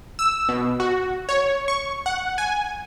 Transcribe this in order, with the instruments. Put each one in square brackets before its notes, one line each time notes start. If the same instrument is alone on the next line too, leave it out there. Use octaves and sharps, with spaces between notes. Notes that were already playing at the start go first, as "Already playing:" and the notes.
[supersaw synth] E6
B2
F#4
C#5
C#6
F#5
G#5